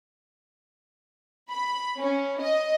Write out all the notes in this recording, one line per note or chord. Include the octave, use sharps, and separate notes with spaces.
B5
C#4
D#5